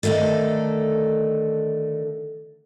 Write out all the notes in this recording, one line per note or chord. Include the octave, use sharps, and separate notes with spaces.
D3 D#3 A3 D#4 A4